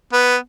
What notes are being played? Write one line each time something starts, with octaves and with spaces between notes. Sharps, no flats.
B3